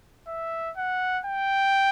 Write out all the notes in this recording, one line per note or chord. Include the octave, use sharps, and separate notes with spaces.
E5
F#5
G5